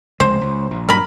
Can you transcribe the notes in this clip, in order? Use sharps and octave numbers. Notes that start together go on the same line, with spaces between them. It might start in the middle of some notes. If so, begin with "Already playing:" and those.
F1 C#2 G#3 C5
C#2
A#1
G2 A#2 F#3 A#4 B5